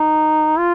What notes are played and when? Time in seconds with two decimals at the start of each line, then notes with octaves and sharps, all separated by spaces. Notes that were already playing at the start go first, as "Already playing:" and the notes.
Already playing: D#4
0.58 F4